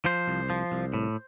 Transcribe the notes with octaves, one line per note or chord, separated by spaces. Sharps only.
F3 C5
C2
F3
C2
A2